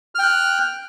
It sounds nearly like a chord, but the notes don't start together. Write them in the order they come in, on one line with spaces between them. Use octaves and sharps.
F6 G5 F#6